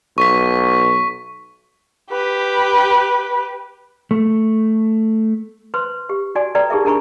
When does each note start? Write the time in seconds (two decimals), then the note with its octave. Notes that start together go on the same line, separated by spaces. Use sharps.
0.18 B1 C#6 B6
2.12 G4 B4
4.11 A3
5.74 B4 C5 C6
6.09 G4
6.35 F#4 D5 G#5
6.55 A4 B4 D5 G5 A#5
6.70 D#4 G4 G#4 A#4 E5
6.85 D4 A#4 G#5 A#5 B5 C#6